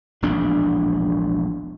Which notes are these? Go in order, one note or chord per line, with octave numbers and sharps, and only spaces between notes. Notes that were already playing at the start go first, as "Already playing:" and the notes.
E1 A#1 A2 D4